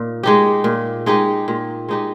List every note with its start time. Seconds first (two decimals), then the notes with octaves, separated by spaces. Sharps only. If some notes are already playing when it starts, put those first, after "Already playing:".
Already playing: A#2 D#4
0.23 G#3 D#4 G4
0.64 A#2
1.06 G#3 D#4 G4
1.48 A#2
1.89 G#3 D#4 G4